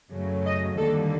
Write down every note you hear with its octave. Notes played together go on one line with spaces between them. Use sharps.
F#2 C#3 F#3 A3
D#5
D#2 D3 G3 A#3 A4